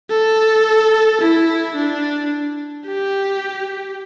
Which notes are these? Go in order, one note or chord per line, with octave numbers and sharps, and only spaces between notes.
A4
E4
D4
G4